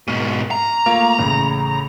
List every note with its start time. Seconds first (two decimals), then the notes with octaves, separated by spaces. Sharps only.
0.08 G#2 B2 C#6 F6 D#7
0.51 A#5
0.86 A3 A#3 F4
1.19 A1 A2 C#3